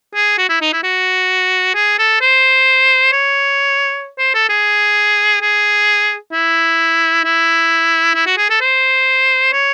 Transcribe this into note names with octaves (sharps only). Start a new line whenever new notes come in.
G#4
F#4
E4
D#4
E4
F#4
G#4
A4
C5
C#5
C5
A4
G#4
G#4
E4
E4
E4
F#4
G#4
A4
C5
C#5